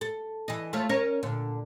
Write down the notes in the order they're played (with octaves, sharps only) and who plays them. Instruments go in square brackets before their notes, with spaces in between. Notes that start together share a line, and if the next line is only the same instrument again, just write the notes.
[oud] A4
E3 D#5
A3 F4 C#5
C#4 A#4 C#5
A#2 D3